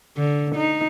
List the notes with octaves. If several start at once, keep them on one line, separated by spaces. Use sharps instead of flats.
D3
D#4